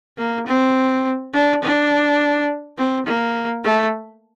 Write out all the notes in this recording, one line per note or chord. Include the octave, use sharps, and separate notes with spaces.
A#3
C4
D4
D4
C4
A#3
A3